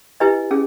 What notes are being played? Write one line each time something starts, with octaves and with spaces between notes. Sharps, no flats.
E4 G4 B4 D#5 G#5
C#4 G#4